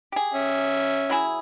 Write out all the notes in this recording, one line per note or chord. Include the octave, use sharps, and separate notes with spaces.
G4 G#4
C#4 E5
F#3 E4 G#4